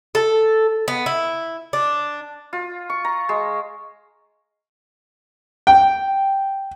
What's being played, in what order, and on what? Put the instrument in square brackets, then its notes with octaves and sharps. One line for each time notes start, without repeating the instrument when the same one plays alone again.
[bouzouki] A4
B3
E4
D4
[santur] F4
C#6
A#5
G#3
[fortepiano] G5